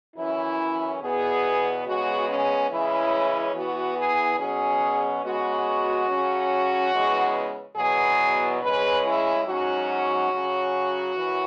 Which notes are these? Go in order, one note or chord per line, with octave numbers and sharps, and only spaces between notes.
F#2 E3 C#4 E4
E2 B2 B3 G#4
C#3 G#3 B3 F#4
C#4
C#3 E3 G#3 C#4 E4
E2 E3 B3 F#4
G#4
B2 F#3 C#4 G#4
C#3 G#3 B3 F#4
C#3 F#3 C#4
C#3 E3 G#3 B3
E2 B2 F#3 B3 G#4
C#3 G#3 C#4 B4
E4
G#2 F#3 C#4 F#4
C#3 F#3 C#4
F#2 E3